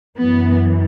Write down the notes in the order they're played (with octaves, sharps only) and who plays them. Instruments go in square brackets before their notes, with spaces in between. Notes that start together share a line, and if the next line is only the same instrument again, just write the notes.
[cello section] F#2 E3 B3